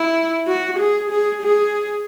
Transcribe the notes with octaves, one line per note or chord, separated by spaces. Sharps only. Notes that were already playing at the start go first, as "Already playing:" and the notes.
Already playing: E4
F#4
G#4
G#4
G#4